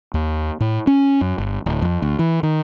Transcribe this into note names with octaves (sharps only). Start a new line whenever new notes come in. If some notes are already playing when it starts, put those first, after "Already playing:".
D#2
A2
C#4
F#2
G1
D1
F2
D2
E3
D#3